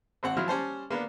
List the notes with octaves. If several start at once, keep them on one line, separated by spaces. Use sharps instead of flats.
G#1 C4 F#5
F3 F#3 E4 C6 F6
G3 C#4 C5 A5
A#3 B3 D4